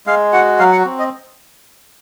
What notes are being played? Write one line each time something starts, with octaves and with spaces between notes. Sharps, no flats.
G#3 F5
F#4 F#5
F#3 F5
F#5
C4
D#5